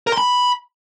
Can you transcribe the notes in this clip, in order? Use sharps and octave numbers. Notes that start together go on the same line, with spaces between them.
A#4
C6
B5